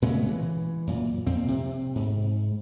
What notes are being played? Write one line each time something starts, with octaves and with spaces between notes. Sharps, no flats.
A#2 C#3 G#3 A3
E3
F#2 A#2
F2 A#2 C4
C3
G#2